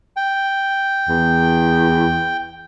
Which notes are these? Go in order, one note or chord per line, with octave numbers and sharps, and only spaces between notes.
G5
E2